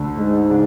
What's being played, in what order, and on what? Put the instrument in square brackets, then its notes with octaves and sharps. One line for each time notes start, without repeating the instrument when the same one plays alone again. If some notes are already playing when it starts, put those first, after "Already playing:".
Already playing: [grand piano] D2 D3 A3 D4
[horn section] G#2
[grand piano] C#3 G#3 D4